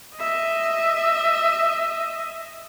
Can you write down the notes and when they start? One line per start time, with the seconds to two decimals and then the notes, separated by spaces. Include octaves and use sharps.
0.17 D#5 E5